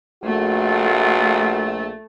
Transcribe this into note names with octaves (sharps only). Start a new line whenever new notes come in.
A#1 A3 F#4